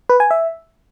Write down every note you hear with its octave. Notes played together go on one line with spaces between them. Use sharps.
B4
G#5
E5